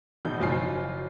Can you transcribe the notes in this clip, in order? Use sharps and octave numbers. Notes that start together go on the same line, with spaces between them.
G#1 G#2 B2 G6
F#1 F3 F#3 F4 G#5 C7